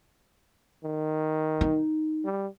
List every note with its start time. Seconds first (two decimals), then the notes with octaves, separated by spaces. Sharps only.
0.84 D#3
1.61 D#4
2.25 G3